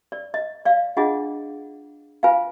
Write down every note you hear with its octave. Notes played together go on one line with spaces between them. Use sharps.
D5
D#5
D5 F5
D4 F4 G#4 D#5 F#5
F4 B4 F5 G#5